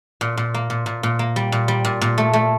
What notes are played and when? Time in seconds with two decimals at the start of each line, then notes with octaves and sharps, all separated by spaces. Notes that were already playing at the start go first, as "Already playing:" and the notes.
0.21 A#2
0.37 A#2
0.54 A#3
0.70 A#2
0.86 A#2
1.03 A#2
1.19 A#3
1.36 G3
1.52 A#2
1.68 G3
1.85 A#2
2.01 A#2
2.18 A3
2.33 A3